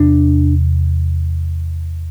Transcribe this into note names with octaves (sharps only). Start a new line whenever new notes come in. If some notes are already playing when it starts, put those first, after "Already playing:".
Already playing: E2 C3 D4